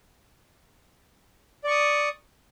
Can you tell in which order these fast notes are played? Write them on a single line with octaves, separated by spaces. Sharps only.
D5 C#6 D#6